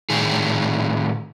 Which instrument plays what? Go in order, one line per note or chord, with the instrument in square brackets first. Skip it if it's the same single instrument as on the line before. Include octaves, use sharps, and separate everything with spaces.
[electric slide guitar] A2 D#3 G#4